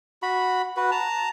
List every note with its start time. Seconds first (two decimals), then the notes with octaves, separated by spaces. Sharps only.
0.22 F#4 B5
0.77 F#4 B4
0.91 A5 A#5